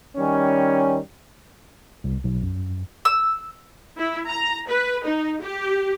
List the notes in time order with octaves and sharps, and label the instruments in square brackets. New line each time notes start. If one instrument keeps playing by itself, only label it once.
[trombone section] D#3 G3 C#4
[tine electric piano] C2
B1
F#2
[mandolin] E6
[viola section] E4
A#5
B4
D#4
G4